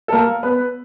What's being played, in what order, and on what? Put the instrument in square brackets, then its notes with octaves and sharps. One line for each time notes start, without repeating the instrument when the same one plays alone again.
[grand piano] A4
A#3 A#4
B3 B4